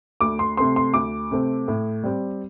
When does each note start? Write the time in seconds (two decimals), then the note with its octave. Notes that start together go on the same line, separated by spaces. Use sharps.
0.21 D2 D6
0.39 C6
0.57 C3 A3 C4 C6
0.76 C6
0.94 D2 D6
1.31 C3 A3 C4
1.68 A2
2.04 G3 C4